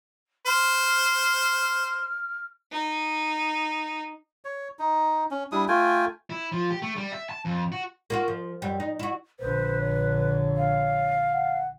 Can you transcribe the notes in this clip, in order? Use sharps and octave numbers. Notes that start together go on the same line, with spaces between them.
C5 F6
D#4
C#5
D#4
C#4
G3 D4 E4 D#6
A3 F4 G5 G#5
E4
F3
G4
A3
G3
E5
A5
F2
F#4
A#3 F4 F#4
F3
F#2 G3
D#4
E4 F#4
A#1 D3 B4 C5
C#5
F5
F#5